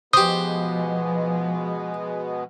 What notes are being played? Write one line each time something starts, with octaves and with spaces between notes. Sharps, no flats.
B2 F3 G#3 B3 G4 C5 D#6